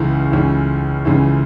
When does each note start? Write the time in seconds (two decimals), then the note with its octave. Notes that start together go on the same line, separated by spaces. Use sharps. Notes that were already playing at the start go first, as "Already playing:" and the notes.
Already playing: C#2 C#3 E3
0.32 C#2 C#3 E3
1.05 C#2 C#3 E3